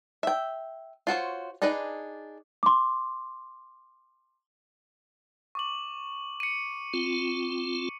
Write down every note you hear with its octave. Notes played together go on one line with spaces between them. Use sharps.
E5 G5
F4 F#4 C5 C#5
D4 D#4 G#4 B4 D5
C6 D6
C#6 D6 F#7
C#7 D#7
C4 F4